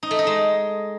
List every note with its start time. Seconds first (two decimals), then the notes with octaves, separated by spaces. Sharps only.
0.03 D#4
0.11 A3
0.19 D#4
0.27 G#3